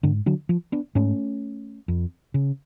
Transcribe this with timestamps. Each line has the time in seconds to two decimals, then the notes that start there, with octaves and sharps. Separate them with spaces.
0.03 G#2 D3
0.26 D3 F#3
0.49 F3
0.72 B3 D4
0.95 G#2 A3 C#4
1.88 F2
2.34 C#3